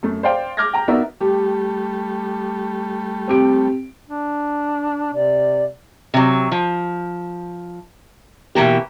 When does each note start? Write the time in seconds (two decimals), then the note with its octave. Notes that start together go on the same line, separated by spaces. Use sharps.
0.03 F#2 A3
0.23 C5 D5 F5 G5
0.57 D6 F6 G6 G#6 A#6
0.73 G5 A#5
0.88 B3 D#4 F#4 A#4 D5 E5
1.21 G3 A3 G4
3.28 C4 G4 D7
4.09 D4
5.14 C3 D5
6.14 C3 F#3
6.52 F3
8.55 B2 E3 A#3 G4